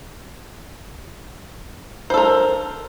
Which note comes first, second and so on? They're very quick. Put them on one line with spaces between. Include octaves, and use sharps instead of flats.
C5 A4 A#4